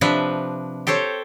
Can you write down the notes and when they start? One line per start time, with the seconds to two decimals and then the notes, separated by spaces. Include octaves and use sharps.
0.01 C3 F3 D4 B4 E5
0.87 G4 A4 C5 C#5